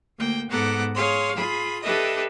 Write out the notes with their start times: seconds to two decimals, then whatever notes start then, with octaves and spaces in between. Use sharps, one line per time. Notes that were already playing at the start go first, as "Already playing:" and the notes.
0.18 D2 A#3 G5
0.50 G#2 B3 A4 F#5 A#5 D6
0.94 G#4 C#5 F5 C6 F6
1.35 F4 G#4 B5
1.82 D4 G4 A4 B4 D#5 E5